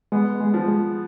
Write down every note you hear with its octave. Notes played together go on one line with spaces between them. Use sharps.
G#3 B3
G#3
F3
G#3